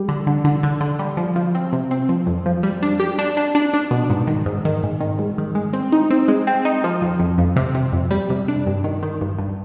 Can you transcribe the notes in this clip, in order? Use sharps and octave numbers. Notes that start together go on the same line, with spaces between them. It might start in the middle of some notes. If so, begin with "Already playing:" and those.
Already playing: G3
D3
D3
D3
D3
D3
G3
F3
F3
C4
C3
C4
F3
F2
F3
G3
D4
G4
D4
D4
D4
D4
B2
G#2
D#3
G#2
D#3
G#2
D#3
G#2
D#3
G#3
C4
D#4
C4
G#3
C4
D#4
F3
F2
F2
F2
C3
C3
F2
G3
C3
D4
G2
D#3
D#3
G2
G2